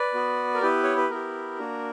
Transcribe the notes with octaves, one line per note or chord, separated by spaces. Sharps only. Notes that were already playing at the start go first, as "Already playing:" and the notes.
Already playing: B4 D5
B3 F#4
A#4
B3 E4 G4 B4
C#5
B4
B3 E4 G4 A#4
A#3 D4 F#4